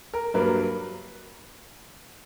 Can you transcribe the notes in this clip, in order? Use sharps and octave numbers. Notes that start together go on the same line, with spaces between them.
A#4
G2 F#3 A#3 B4